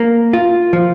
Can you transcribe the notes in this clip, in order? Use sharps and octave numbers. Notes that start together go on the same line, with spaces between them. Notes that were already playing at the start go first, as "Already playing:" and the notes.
Already playing: A#3
F4
F3